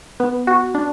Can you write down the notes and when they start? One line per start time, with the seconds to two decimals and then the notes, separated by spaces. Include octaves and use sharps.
0.20 B3
0.47 F#4
0.75 D4